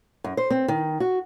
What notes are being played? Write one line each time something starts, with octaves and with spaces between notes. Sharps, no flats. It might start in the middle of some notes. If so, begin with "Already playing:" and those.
F#2
C5
C4
D#3
F#4